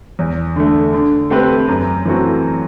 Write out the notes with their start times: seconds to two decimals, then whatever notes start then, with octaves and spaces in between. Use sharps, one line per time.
0.19 E2
0.56 D3 A3
0.93 D3
1.30 A3 C4 G4 B4
1.68 F#2
2.05 E3 A3 C4 F#4